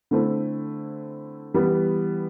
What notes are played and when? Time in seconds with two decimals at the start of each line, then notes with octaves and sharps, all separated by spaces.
0.11 D3 A3 C4 E4
1.54 E3 G3 B3